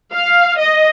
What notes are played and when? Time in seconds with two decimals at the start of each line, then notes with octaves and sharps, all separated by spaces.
0.13 F5
0.60 D#5